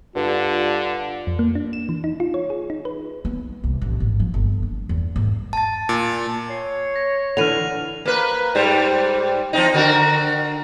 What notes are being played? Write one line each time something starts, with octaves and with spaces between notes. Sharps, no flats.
G2 D3 F4
F2
A#3
D4
E7
E3
D#4
F4
C#5
G#4
D#4
B4
B3
C2
A1
G#1
F3
G1
D4
E2
G#1
A5 A6
A#2
C#5 C7
A#6
D3 E3 F6 D#7 F7
A#3 B4
G#2 G3 C5
F3 C4 D#4
D3 F#4 A#4